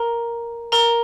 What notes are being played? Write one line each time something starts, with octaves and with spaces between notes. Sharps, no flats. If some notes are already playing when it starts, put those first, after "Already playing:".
Already playing: A#4 A#5
A#4 A#5